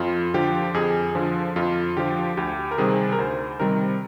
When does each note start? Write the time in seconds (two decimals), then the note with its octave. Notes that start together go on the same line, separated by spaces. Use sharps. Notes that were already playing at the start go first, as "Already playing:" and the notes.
Already playing: F2 F4
0.34 D3 F3 G4
0.74 F2 G#4
1.15 D3 F3
1.56 F2 F4
1.97 D3 F3 G4
2.37 D2 G4
2.71 A#4
2.78 C3 D#3 G3 C4 G#4
3.12 A#4
3.18 D2 C5
3.60 C3 D#3 G3 C4 A#4